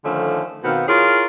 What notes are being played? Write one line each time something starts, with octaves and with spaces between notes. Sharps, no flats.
D3 D#3 F3 A3 C#4 D#4
B2 D#3 B3 C4 F5
E4 F4 G#4 A#4 C#5